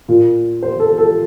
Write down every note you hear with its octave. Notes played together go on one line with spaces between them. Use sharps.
A#2
C5
A4
A4